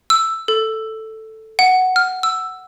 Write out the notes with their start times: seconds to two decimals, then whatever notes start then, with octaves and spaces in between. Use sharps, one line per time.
0.10 E6
0.48 A4
1.59 F#5
1.96 F6
2.23 E6